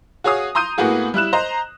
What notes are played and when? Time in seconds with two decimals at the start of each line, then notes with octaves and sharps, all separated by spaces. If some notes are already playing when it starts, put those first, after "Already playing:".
0.24 F#4 G#4 C#5 F5 D#6
0.55 A#5 C6 D#6 G6 D#7
0.78 A2 A#3 B3 F#4 G#4
1.14 G3 E4 F#6 E7
1.33 C5 D#5 A#5